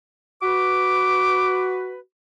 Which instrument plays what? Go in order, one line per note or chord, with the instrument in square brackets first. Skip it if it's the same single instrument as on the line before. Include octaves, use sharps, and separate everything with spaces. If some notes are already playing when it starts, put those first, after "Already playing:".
[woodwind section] F#4 B4 [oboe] D6